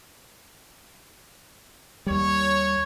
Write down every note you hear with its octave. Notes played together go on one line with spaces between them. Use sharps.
D#2 G3 C#5